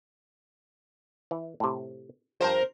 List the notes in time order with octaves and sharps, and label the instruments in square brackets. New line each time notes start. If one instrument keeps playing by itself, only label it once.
[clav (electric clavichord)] E3
A2 C3
[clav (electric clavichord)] G2 F3 [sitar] A#4 C5